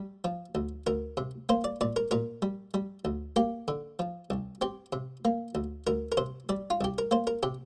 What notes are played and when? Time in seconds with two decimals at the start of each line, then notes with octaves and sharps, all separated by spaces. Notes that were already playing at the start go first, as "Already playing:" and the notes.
Already playing: G3
0.24 F3
0.55 D2
0.87 D2 A#4
1.17 C3
1.49 A#3 C5
1.64 D5
1.81 A#2 D5
1.96 A#4
2.11 A#2 A#4
2.42 G3
2.74 G3
3.05 D2
3.36 A#3 G4
3.68 D3
3.99 F3
4.30 C2
4.61 C4 G4
4.93 C3
5.25 A#3
5.55 D2
5.87 D2 A#4
6.12 A#4
6.17 C3 C5
6.49 G3 D5
6.70 F4
6.81 C2 G4
6.98 A#4
7.11 A#3 C5
7.27 A#4
7.43 C3 G4